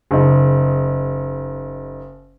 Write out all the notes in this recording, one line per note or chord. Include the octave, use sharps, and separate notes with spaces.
F#1 D#4